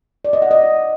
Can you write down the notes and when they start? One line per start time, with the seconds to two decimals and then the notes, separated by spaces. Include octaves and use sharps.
0.25 D5
0.33 D#5
0.42 F#5
0.51 D#5